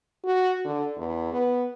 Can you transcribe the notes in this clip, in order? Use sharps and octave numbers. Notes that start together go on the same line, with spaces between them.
F#4
D3
E2
B3